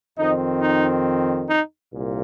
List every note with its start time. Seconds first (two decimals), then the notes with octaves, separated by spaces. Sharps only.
0.18 F2 D#3 C4 D#4
0.62 D#4
1.49 D#4
1.93 C2 A#2